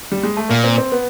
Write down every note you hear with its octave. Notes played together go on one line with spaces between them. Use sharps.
G3
G#3
A3
A#2 A#3
C4
C4
B3